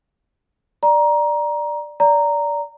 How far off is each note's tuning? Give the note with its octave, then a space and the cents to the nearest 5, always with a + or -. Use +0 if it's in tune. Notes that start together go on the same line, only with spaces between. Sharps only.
D5 +10 A#5 +15
D5 -20 A#5 -5